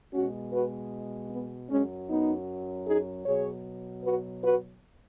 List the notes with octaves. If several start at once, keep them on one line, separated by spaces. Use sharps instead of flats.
B2 G#3 C#4 F#4
F#4 B4
B3
F#2 F#3 G#3 C#4
B3 D#4
D#4 G#4
B2 F#3 G#4 C#5
F#4 B4
F#4 B4